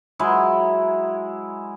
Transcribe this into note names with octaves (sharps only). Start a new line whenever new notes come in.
F#3 G#3 E4